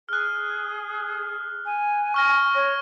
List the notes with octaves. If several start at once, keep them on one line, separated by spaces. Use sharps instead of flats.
G#4 F6 F#6
G#5
C#6 F6 A#6
C#5 A#6